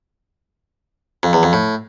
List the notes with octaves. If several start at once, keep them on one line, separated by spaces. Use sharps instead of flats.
F2
E2
F2
A2